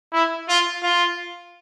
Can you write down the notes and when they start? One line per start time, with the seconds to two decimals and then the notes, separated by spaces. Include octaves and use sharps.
0.13 E4
0.49 F4
0.83 F4